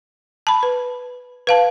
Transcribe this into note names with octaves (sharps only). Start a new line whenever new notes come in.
A5 B5
B4
B4 F5 A5